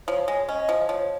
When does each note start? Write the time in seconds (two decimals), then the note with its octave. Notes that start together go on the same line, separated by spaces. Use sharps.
0.07 F3 C#5
0.28 G#3
0.48 C#4 D#5
0.69 F3
0.88 F3 C#5